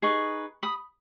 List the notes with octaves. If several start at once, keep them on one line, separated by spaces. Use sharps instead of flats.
D#4 G#4 B4 C#6
B5 D#6